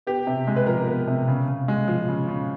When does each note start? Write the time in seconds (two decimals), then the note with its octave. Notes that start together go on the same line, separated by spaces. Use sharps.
0.07 B3 G4
0.27 C3
0.47 G#3
0.56 B4
0.67 F3 A#4
0.87 B3
1.07 C3
1.28 C#3
1.48 C#3
1.68 G#3
1.88 F3
2.09 C#3
2.28 C#3